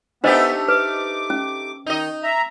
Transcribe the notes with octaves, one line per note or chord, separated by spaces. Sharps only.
A3 B3 D4 D#4 G4 C5 D#5 E5
B4 D6
C#4
D#3 D#4 D#5
E5 A#5